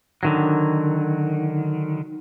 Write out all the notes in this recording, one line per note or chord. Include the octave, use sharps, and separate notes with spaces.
D3 D#3 F#3